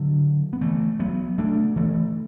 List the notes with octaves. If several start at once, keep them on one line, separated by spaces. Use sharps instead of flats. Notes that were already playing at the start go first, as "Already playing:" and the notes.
Already playing: D3 F#3
B3
E3 A3
F#3 B3
A3 D4
E3 A3